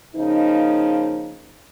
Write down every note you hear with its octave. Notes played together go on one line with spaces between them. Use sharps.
C#3 F3 A#3 D#4